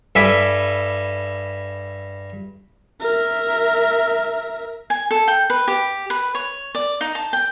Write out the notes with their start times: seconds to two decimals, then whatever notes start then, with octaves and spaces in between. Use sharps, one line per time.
0.15 G2 A4 E5 G#5 B5 D6
3.00 A#4 E5
4.90 G#5
5.11 A4
5.28 G5
5.50 B4
5.68 G4
6.10 B4
6.35 C#5
6.75 D5
7.01 D#4
7.15 A5
7.33 G5